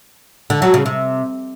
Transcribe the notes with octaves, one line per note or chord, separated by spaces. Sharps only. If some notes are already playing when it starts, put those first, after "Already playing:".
D3
F#3
C#3
C3